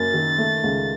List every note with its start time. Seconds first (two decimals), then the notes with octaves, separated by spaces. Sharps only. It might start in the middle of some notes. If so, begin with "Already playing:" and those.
Already playing: F#2 A#3 A6
0.14 D#3
0.38 A3
0.64 C#2